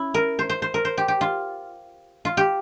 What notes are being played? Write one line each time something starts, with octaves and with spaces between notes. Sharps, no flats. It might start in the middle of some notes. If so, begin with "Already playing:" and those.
Already playing: C#4 E4
A#4
C5
C5
C5
A#4
C5
G4
G4
F4
F4
G4